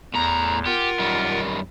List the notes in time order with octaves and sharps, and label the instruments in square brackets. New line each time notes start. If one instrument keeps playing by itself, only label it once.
[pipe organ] E2 [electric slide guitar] A2 A#5
[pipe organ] F4 A#4 F#5 [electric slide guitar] G4
[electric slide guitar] F#2 D#3 G3